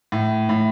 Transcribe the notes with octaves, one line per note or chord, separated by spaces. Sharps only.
A2
A2